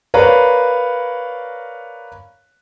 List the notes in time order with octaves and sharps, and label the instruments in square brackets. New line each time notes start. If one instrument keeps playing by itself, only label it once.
[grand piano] A#4 B4 C#5 D5 F5 A#5